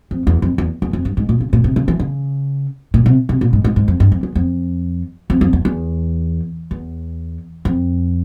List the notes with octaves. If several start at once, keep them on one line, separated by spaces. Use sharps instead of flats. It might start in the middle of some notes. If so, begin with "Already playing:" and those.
F2
E2
F2
E2
E2
F2
G2
G#2
A#2
C#3
A#2
C3
C#3
E3
C#3
A#2
C3
C3
A#2
G#2
G#2
G#2
F2
G2
F2
E2
F2
F2
F2
E2
E2
E2
F2